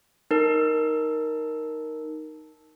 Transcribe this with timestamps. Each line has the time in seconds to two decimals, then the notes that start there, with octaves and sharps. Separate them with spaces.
0.31 D#4 A#4